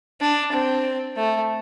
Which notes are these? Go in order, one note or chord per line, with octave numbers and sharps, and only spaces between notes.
D4
C4
A3